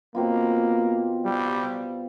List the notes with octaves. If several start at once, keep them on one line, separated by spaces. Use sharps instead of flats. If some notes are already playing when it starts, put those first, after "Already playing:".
B2 A#3 C4 F4
G3